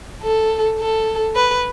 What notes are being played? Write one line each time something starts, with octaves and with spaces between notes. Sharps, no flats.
A4
A4
B4